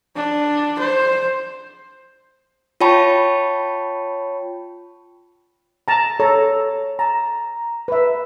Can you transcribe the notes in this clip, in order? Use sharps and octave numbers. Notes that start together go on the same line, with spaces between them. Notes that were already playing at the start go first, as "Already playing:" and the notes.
D4
C5
F4 C#5 G5 A5 B5 C#6
A5 A#5
A4 C#5 A#5
A5 A#5
B4 E5